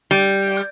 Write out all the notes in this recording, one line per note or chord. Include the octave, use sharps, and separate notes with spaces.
G3